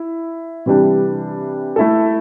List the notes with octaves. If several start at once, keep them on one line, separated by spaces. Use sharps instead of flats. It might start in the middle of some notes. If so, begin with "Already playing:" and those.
Already playing: E4
C3 E3 G3 D4 G4
A3 E4 A4